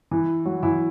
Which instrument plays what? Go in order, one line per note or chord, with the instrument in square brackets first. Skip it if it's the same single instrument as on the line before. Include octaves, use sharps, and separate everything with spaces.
[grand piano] E3 E4
F#3 F#4
E3 E4